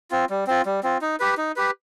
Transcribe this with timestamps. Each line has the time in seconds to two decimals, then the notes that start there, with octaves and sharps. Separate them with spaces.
0.11 C4 F4
0.30 G3
0.47 C4 F4
0.66 G3
0.83 C4 F4
1.01 D#4
1.20 G4 B4
1.37 D#4
1.56 G4 B4